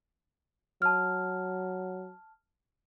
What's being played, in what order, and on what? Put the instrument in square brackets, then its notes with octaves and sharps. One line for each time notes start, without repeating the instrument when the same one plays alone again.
[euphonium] F#3 [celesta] A5 F6